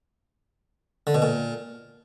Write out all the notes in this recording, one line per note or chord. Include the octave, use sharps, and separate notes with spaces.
D3
B2
A#2